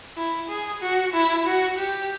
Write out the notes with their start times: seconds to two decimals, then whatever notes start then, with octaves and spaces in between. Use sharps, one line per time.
0.17 E4
0.49 G#4
0.82 F#4
1.13 E4
1.46 F#4
1.78 G4